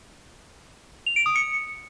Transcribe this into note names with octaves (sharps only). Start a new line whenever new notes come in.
F7
D7
D#6
C#7